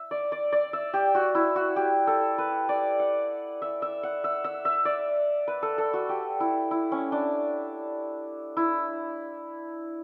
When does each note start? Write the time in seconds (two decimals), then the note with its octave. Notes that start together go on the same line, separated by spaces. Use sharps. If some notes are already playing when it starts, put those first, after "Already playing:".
Already playing: E5
0.11 D5
0.32 D5
0.52 D5
0.73 E5
0.94 G4
1.15 F#4
1.35 E4
1.56 F#4
1.76 G4
2.07 A4
2.38 B4
2.69 D5
3.00 F#5
3.62 E5
3.82 E5
4.03 F#5
4.24 E5
4.44 E5
4.65 E5
4.85 D5
5.48 B4
5.63 A4
5.78 A4
5.94 F#4
6.09 G4
6.40 E4
6.71 E4
6.92 C#4
7.12 D4
8.57 E4